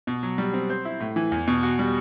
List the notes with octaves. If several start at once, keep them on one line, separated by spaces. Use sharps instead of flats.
B2
F#3
G3
C4
C5
E4
A2
E3
E2
B2
F#4
G3